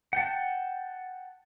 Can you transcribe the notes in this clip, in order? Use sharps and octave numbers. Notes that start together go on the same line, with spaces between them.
F#5 G5 A5